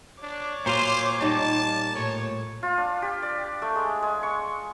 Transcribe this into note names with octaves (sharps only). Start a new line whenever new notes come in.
D4 C#5 D6
A#2 F#3 F4 C5
G3 D#4 A5
A2 C#5
F4
D4
G4
D5
A3
G#3
G#3
C#6